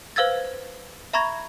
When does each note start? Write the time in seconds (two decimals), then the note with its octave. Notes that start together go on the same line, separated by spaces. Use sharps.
0.16 B4 C5 F5 E6 G#6 A6
1.13 E5 A#5 B5 C#6 G#6 A#6